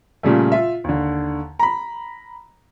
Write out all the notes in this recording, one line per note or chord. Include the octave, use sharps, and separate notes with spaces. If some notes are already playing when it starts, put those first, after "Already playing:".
A#2 C#3 G3 A3
F4 E5
D#2 D3
A#5 B5